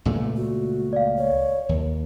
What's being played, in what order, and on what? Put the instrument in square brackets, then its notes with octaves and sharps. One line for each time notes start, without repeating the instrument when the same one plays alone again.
[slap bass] C#2 A#2 A3
[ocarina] F#4
[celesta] D5 F5
[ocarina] C#5
[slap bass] D#2